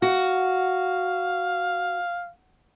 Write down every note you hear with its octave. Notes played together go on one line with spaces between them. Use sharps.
F#4 F5